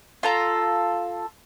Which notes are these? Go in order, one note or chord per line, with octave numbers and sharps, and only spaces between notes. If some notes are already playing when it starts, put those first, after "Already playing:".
F4 A4 A#5